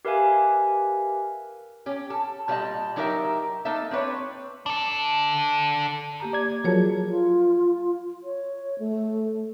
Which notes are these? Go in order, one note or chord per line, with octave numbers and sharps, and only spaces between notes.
G4 A#4 B4 E5 F5 G#5
C#4 G4
A4
A#2 G3 B3 F4 D#5 A5
F#3 D4 D#4 G4 A#4 E5
A#3 D#4 A4 E5
C4 D4 B4 C#5
D4 A4
A#3 G4 A#5
D5 G#6
F3 F#3 G#4 A#4 C#5 A5
F4
C#5
A3